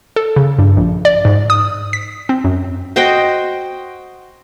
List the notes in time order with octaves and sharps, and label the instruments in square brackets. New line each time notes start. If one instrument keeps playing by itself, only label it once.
[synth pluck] A4
C#3
G2
A#1
D5
G#2
D#6
B6
C4
F#2
[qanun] F#4 C5 D#5 G5